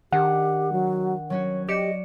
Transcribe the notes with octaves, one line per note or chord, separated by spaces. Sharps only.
D#3 D4 G4 F#5
F#3
F#3 C#4 F#4 C#5
G4 D5 D#5 C#7 E7